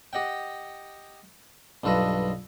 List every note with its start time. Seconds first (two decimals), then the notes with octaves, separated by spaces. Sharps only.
0.13 G4 D#5 F#5 G5
1.84 B1 G2 F4 A4 B4 D#5